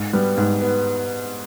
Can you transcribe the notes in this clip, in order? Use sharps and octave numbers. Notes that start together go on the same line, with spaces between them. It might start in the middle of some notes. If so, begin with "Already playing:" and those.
Already playing: G#2
G3 B3
G#2
B3